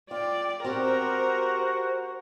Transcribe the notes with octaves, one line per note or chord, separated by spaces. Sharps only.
F4 D5 G5
C4 F#4 G4 A#4 C5